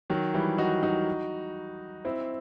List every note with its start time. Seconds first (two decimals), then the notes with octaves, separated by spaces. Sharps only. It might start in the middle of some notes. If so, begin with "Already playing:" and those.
0.10 D#3 F#3
0.34 E3 G3
0.58 D#4 F#4
0.83 D#4 F#4
2.05 C4 E4